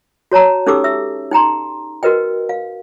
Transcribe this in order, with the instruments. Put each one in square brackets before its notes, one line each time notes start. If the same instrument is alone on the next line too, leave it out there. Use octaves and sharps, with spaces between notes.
[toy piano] F#4 C#5 A5 A#5
C#4 D#4 G4 A4 D6 E6
E5 E6
D#4 G5 A#5 C6
F#4 A#4 B4 D#5 G5
F5